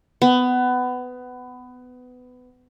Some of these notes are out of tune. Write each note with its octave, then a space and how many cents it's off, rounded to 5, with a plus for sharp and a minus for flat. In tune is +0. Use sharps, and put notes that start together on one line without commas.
B3 +20